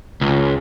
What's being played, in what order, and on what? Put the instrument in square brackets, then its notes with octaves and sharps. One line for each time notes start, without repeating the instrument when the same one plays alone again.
[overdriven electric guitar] C#2